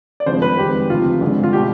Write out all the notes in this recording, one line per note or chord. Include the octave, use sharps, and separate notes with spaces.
D5
G#1 G2 F3 G#3 C5
B4
F2 D#3 G#3 G4
D2 C3 F3 F4
G#1 G2 D3 G#3
F4
B2 G3 G4